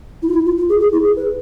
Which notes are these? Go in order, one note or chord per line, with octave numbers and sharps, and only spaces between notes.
E4
F4
E4
F4
F4
G#4
G#4
E4
G#4
B4